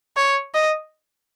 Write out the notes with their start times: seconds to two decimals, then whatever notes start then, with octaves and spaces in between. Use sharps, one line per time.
0.17 C#5
0.54 D#5